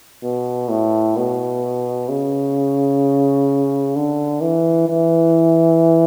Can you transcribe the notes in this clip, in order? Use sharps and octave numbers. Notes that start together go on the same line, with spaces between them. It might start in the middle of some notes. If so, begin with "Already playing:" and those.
B2
A2
B2
C#3
D3
E3
E3